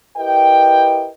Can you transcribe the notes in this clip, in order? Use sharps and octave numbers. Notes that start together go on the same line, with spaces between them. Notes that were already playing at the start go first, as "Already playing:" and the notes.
E4 G4 A#4 B4 D#5 G5